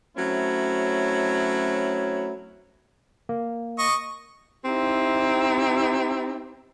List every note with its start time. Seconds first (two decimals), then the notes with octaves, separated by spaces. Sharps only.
0.17 F#3 A3 C4 C#4 E4
3.29 A#3
3.79 D#5 C#6
4.65 C4 D#4 E4 G4